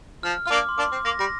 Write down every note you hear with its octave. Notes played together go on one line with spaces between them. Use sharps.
F3 F6
F4 F6
A#3 D4 D6
C6
A#3 D4 D6
C4 D6
A#3 A#6
G3 A#6